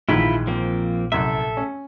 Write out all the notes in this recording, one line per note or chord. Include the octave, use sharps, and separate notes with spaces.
A#1 D#2 G#2 E3 E4 F4 B5
F3 A#3 C4
C2 F#2 A4 E5
C#4